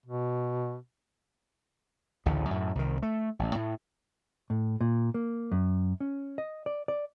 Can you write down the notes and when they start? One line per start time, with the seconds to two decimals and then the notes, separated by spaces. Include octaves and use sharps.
0.06 B2
2.26 A1 D2 A2 C#3
2.50 F#2 A2
2.75 C2 D#3
3.02 A3
3.39 A1
3.55 A2
4.50 A2
4.81 A#2
5.14 A#3
5.52 F#2
6.00 C#4
6.38 D#5
6.66 D5
6.88 D5